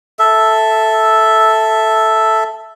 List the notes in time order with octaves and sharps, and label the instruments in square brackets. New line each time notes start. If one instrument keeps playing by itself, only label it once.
[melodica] A4 E5